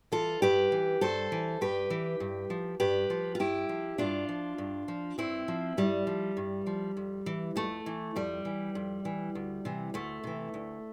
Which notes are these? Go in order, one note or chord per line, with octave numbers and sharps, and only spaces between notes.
E3 F4 A4
G2 G4 B4
E3
G2 A4 C5
E3
G2 G4 B4
E3
G2
F3
G2 G4 B4
F3
F4
G2 E4 G4
F3
G2 D4 F4
F3
G2
F3
G2 C4 E4
F3
G2 G3
F3
G2
F3
F2
E3
F2 A3
E3
F2 G3
E3
F2
E3
D2
C3 E3
D2 A3
C3 E3
D2